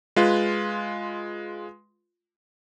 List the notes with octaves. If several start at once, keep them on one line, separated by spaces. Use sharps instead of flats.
G#3 F4 B4